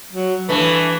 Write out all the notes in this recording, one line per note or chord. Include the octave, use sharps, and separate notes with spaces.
F#3
G2 E3 A3 B4